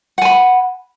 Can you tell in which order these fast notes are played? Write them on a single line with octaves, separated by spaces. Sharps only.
F#5 G#5 B5